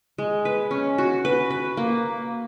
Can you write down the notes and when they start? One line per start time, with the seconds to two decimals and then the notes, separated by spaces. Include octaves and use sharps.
0.18 G#3
0.45 B4
0.71 C#4
0.98 F#4
1.25 B4
1.50 B4
1.77 A#3